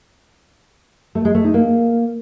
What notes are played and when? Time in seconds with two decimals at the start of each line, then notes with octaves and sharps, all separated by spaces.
1.15 A3
1.25 G#3
1.35 A3
1.44 D#4
1.54 A#3